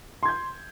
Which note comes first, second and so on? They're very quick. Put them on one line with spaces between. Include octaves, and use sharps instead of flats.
C6 G#6 G6